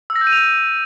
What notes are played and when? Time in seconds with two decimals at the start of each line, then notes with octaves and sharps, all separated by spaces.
0.10 E6
0.16 A#6
0.21 G6
0.27 D#7
0.33 F7